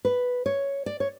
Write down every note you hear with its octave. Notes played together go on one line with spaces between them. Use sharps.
B4
C#5
D5
C#5